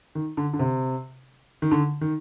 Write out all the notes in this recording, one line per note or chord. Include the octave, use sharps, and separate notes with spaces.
D#3
D3
D3
C3
D#3
D3
D#3